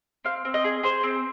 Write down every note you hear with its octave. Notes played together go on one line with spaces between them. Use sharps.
C4 F5
C4
D#5
G#4
G#4 C5
C4